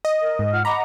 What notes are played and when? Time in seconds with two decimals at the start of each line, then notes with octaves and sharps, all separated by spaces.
0.05 D#5
0.20 A#4
0.39 G#2
0.52 F4 F#5 F6
0.65 D#5 F#5 A#5 B5 D6